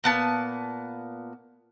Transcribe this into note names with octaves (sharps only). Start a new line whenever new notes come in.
A#2 B3 A5